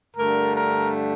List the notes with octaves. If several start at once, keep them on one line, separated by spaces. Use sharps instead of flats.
G2 D3 A3 A#4
A#4